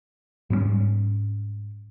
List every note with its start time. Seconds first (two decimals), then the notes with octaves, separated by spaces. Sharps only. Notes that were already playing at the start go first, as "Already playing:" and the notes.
0.50 G#2 G3 G#3 C#4